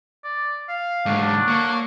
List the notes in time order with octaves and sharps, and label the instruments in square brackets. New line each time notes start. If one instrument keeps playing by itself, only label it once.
[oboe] D5
F5
[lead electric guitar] G#2 D3 [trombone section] F#3 A3 D4
[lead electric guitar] A#3 [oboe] C#6